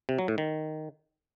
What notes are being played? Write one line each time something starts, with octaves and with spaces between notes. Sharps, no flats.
C3
F#3
A2
D#3